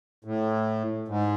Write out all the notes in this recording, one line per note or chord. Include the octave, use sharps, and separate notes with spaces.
A2
G#2